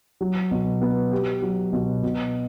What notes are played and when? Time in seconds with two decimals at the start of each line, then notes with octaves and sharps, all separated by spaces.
0.21 F#3
0.51 B2
0.82 B3
1.12 G4
1.42 F#3
1.73 B2
2.03 B2